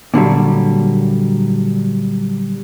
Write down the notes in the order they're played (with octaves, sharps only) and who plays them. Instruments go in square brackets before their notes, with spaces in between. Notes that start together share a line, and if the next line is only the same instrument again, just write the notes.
[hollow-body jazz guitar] A#2 D3 F#3 G3